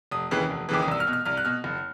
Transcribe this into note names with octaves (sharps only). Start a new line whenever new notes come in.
F1 D#6
D#2 C#3 E3
F1
D#2 C#3 E3 D6
D#6
C2 E6
F6
B2
F6
C2 F6
F#6
B2 F6
F#1